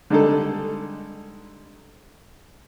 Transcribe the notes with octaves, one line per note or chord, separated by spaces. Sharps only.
D3 G3 G#3 D#4 G#4 A4